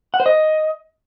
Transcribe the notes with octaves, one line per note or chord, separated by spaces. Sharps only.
F#5
C5
D#5